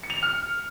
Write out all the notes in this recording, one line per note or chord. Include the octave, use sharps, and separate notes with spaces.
C#7
F7
C#7
F6